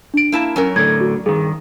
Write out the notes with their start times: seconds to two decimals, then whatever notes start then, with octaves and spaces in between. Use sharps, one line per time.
0.14 D4 D7
0.32 A#3 E4 A5
0.56 F#3 C#4 A#4
0.76 A2 D3 G#6
1.01 F#4
1.26 G2 D#3 G#4